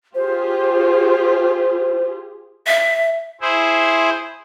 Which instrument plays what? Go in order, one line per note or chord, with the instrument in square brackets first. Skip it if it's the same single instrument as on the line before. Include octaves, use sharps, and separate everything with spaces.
[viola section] F4 G4 G#4 [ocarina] C5
[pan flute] E5
[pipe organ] E4 G#4 C5